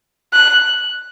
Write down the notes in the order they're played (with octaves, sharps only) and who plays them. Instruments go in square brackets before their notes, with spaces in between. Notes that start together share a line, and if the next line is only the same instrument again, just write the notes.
[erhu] F#6